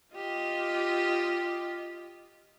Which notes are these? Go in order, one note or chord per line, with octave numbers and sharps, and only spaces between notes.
F4 G4 D#5